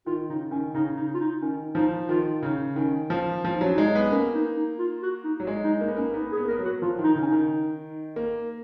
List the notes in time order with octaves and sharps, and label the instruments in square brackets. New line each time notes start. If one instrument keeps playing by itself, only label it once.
[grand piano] D#3 [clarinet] F4
[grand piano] C#3 [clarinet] D#4
[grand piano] D#3 [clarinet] C#4
[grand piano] C#3 [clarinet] D#4
[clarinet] D#4
F4
D#4
[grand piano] D#3 [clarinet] C#4
[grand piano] F3 [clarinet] D#4
[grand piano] D#3 [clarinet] F4
[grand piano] C#3 [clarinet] D#4
[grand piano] D#3 [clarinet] C#4
[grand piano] F3
[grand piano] F3 [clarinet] F4
[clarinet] D#4
[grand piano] F#3 [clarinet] C#4
[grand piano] G#3 [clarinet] D#4
[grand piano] B3
[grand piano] A#3 [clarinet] C#4
[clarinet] D#4
D#4
F4
F#4
D#4
[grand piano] F#3
G#3
[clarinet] D#4
[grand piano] A#3 [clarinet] D#4
[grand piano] B3
[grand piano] A#3 [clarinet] C#4
[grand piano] B3 [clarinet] D#4
[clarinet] G#4
[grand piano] B3
A#3
[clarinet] A#4
[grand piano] B3
F#3
[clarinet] F#4
[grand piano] F3 [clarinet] F4
[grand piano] D#3
[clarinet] D#4
[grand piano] C#3
[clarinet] C#4
D#4
[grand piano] D#3
A#3